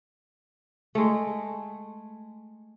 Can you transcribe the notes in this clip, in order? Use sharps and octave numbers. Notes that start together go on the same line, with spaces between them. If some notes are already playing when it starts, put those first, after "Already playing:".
G#3 A3